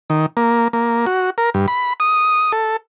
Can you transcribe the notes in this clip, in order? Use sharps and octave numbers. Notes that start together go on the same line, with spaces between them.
D#3
A#3
A#3
F#4
A#4
G2
B5
D#6
A4